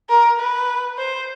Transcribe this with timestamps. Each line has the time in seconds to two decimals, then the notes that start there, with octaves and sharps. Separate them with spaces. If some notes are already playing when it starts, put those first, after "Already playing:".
0.10 A#4
0.40 B4
0.98 C5